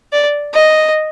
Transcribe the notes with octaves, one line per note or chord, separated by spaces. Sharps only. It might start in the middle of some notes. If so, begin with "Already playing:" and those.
D5
D#5